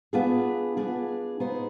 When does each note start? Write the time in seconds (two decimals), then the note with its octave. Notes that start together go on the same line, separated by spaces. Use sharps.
0.13 B3 D4 F4 G#4
0.77 B3 D4 F4 G#4
1.40 B3 D#4 G#4 C5